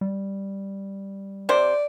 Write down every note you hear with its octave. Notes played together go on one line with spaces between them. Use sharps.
G3
C3 C5 D5